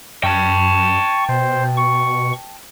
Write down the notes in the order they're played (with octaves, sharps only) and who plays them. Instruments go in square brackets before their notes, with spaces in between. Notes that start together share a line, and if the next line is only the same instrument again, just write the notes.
[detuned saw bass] F#2 [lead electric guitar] G5 A5 [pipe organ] C#6
[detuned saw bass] B2 [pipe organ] C5
[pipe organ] C#6